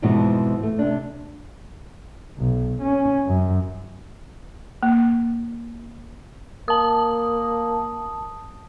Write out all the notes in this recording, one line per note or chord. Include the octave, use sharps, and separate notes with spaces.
F2 G#2 B2 E3 F3
A3
C3 D4
B1
C#4
F#2
A#3
A#3 A5 D#6